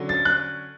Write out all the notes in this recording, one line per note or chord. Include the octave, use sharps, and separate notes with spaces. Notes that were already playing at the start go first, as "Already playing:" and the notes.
Already playing: D3 F#3 C#4
A6
F#6